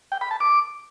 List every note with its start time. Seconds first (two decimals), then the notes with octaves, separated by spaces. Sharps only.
0.12 G5
0.21 B5
0.31 A5
0.40 D6